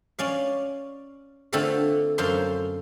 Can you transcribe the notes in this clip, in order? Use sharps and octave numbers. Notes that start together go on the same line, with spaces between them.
C#4 D5 F5
D3 A3 C4 F4 A4 F5
F#2 A4 C5 F5 C6